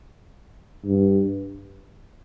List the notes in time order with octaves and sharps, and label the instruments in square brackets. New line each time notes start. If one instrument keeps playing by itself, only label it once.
[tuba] G2